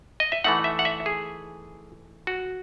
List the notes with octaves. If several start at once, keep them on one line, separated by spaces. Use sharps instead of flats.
D#5
E5
E3 A3 D#4 F#5
E5
F#5
E5
G#4
F#4